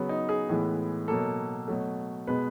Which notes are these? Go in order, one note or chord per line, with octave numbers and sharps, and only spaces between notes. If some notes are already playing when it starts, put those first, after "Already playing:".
Already playing: C#3 F#3 B3
D#4
G#4
A2 E3 G#3 B3
B2 F#3 A#3 A4
B2 F#3 A3
B2 G#3 B3 B4